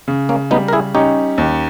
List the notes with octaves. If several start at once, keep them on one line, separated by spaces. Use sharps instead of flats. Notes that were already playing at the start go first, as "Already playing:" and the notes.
C#3
A#3 C#4
G3 B3 D#4
A#4
E4 G#4
C#4 D#4 G4
D#2